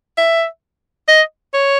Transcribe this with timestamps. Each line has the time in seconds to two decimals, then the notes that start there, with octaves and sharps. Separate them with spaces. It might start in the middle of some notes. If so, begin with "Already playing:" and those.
0.18 E5
1.08 D#5
1.54 C#5